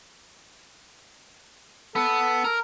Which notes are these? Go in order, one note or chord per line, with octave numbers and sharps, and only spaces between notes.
B3 A4
A#4